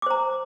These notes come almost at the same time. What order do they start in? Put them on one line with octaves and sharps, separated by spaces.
D6 C5 A#5